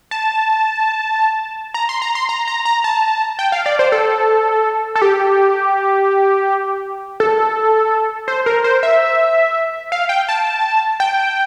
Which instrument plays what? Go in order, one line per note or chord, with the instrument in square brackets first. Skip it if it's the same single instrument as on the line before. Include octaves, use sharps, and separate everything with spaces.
[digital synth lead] A5
A#5
C6
A#5
C6
A#5
A#5
A#5
A5
G5
F5
D5
C5
A4
A4
G4
A4
C5
A#4
C5
E5
F5
G5
A5
G5